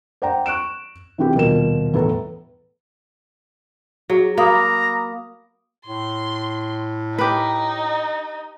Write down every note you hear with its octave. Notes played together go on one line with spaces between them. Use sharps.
C5 D5 F#5 G5 A#5
C#6 F#6 D7 E7
C3 E3 C4 F#4 G4
D#1 B2 F3 A#3 A#4 E7
E2 A2 B3 A4 B4 A#5
F#3 F#4 G#4
A#3 A#5 B5 D6 D#6
A2 C6
D#4 G4 B4